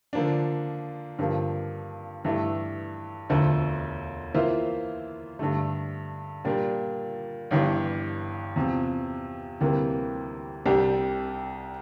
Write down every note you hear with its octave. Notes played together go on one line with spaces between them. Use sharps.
D3 F3 A#3 D4
G2 D3 F3 A#3
G2 E3 A3 E4
E1 D2 D3 F3 A3
E3 A#3 F4 C5 E5
G2 D3 A3
A#2 G3 D4
G1 G2 E3
E2 C3 F3
D2 C3 E3 G3 A#3
C2 C3 G3 D4 G4